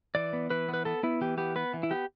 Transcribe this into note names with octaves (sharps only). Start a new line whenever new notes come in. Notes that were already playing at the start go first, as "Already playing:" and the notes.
E3 D5
B3
E3 B4
B3
B4
B3 A4
B3 E4
E3 G4
B3 G4
B3 B4
E3
E4
B3 G4